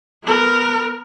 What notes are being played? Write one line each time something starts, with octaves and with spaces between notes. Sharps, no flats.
B3 A#4